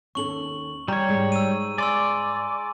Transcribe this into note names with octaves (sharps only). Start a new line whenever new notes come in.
D#2 C#4 A4 C#6 F#7
G3 C#5 A#5
G#2 G#3
E6 D#7
D5 G#5 C6 E6